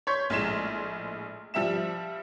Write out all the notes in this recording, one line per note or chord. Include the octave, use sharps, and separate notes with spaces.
C#5 C6 C#6 G6 G#6 B6
A#1 A2 G#3 C6 B6 E7
F3 G3 E5 E7